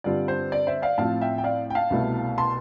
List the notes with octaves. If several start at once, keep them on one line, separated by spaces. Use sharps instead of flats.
G2 D3 G3 C4 F4 D5
C5
D5
C5 E5
D5 F5
A2 F3 C4 F4 F5 A5
E5 G5
G5
D5 F5
G5
F5 A5
C2 B2 A3 E4
A5 C6